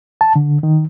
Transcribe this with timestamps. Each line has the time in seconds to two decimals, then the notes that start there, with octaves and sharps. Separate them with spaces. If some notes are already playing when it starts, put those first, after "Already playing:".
0.21 A5
0.36 D3
0.63 D#3